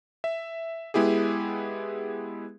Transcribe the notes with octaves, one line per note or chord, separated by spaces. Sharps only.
E5
G#3 B3 E4 G4 G#4